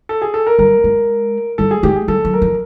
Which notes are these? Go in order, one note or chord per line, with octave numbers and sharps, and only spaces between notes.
A4
G#4
A4
A#4
G3 A#4
G#3
G3 A4
G#4
G#3 G4
G#4
G3 A4
F#3
A#4
F3